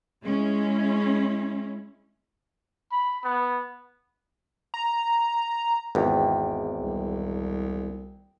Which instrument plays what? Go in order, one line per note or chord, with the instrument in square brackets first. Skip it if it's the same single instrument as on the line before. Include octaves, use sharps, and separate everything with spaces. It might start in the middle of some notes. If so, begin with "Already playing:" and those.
[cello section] G#3 C#4 E4
[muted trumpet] B5
B3
[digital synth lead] A#5
[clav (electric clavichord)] G#1 E2 [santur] G5
[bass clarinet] C2